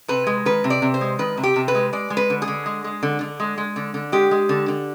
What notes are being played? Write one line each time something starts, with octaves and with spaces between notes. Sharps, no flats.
C3 B4
G#3
D#3 B4
C3
D5
C3
C5
G#3
D#3 B4
C3
G4
C3
B4
G#3
G#3 D5
G#3
B4
D3
G#4
D3
G#3
G#3
D3
D3
G#3
G#3
D3
D3
G#3 G4
G#3
D3
D3